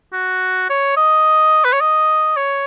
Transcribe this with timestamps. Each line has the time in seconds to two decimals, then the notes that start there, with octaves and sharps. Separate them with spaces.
0.13 F#4
0.70 C#5
0.97 D#5
1.65 B4
1.73 C#5
1.81 D#5
2.37 C#5